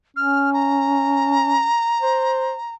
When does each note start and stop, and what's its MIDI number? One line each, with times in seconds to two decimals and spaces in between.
0.16 1.66 61
0.16 0.53 89
0.53 2.75 82
2.01 2.54 72